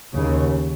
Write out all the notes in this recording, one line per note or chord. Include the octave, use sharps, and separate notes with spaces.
D#2 C#3